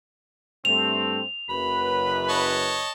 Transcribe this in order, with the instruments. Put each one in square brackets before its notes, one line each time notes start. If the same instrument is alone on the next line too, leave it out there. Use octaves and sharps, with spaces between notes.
[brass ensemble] G2 A3 C4 [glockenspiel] F7
[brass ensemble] F#1 F#2 B4 [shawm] B5
[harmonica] C#5 D#5 A5